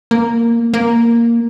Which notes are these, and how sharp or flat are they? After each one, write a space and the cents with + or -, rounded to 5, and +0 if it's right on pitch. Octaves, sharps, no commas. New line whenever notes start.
A#3 -5
A#3 +0